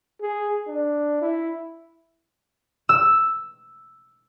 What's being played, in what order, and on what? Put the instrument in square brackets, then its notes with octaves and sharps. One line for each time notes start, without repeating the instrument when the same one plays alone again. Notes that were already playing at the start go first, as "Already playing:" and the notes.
[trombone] G#4
D4
E4
[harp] E6